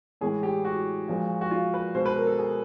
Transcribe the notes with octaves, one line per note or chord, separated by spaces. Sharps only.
A2 E3 G#3 G#4
G4
F#4
A#2 F3 G#3
F#4
F4
B4
B2 G#3 C5
B4
A#4
A4
G#4